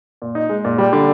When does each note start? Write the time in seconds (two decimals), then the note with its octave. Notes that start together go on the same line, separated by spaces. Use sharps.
0.22 A#2
0.35 D#4
0.49 G#3
0.65 A#2
0.78 G3
0.93 D3